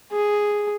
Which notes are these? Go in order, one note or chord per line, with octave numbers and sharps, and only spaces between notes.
G#4